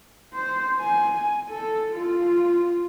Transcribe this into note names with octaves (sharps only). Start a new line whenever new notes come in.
C5
G#5
A4
F4